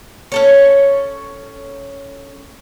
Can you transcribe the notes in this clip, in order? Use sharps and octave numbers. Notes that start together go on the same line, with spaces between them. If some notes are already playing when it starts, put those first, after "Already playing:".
C#4 A4 C#5